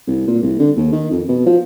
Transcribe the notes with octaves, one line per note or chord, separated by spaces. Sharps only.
C2
A#2
C2
D3
D#2
D#3
F2
B2
F3